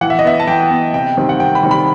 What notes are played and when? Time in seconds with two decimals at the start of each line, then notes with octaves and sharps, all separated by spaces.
0.01 E3 F#5
0.10 E5
0.19 D#5
0.24 B3 E5
0.40 A5
0.47 E3 G5
0.71 B3
0.94 C3 G5
1.17 D#3 G3 C4
1.29 F#5
1.40 C3 G5
1.55 B5
1.63 D#3 G3 C4
1.71 B5